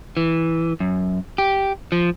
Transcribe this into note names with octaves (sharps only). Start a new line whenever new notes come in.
E3
F#2
G4
F3